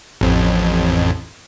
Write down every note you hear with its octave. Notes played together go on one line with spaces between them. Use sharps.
A1 F2